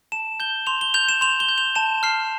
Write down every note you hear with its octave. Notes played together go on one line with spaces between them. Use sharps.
A5 E7
G6 G7
C6 F7
G7
G6 F7
E7
C6 F7
G7
G6
F7
A5 E7
F6 C7